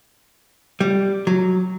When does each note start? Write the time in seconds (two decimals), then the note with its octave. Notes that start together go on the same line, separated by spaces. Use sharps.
0.80 G3
1.27 F#3